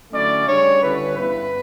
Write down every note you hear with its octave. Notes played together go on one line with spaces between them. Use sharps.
D3 F#3 A3 C#4 E4 D5
C#3 G3 D4 C#5
D3 G3 C#4 E4 B4
G2 E3 B3 E4 B4